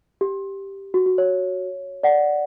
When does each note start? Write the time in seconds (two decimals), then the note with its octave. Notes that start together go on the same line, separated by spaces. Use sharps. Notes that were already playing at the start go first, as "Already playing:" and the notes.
0.21 G4
0.94 F#4
1.06 F#4
1.18 C#5
2.03 D5 F#5